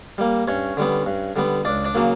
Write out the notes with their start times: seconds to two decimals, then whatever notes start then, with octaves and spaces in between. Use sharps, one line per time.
0.18 G3 A#3
0.48 G2 C#4 C#5
0.77 D3 G3 B3
1.06 G2
1.36 D3 G3 B3
1.65 C#2 D4 D5
1.84 D4 D5
1.95 C#3 F#3 A#3